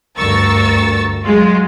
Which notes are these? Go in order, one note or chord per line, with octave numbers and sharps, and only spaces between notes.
D2 G2 A#4 C#6 E6 A6
F#3 G#3 F4